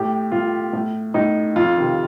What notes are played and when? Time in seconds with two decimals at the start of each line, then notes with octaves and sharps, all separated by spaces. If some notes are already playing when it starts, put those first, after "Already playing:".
Already playing: A2 G4
0.32 A2 F4
0.73 A2
1.14 A2 D#4
1.56 F2 F4
1.77 C3 D#3